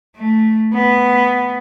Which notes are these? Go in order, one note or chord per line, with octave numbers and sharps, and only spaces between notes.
A3
B3